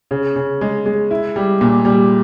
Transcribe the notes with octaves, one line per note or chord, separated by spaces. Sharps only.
C#3
C#3
G#3
G#3
E4
G3
A#2
G3